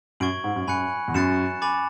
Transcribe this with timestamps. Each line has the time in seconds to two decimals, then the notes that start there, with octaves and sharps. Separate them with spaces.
0.20 F#2 C#6 G#6 D7 F#7
0.44 G#2
0.56 F#2
0.68 F#2 G#5 B5 F#6 C#7
1.08 E2
1.14 F#2 F#6 A6 C#7 E7
1.62 G#5 B5 D6 A6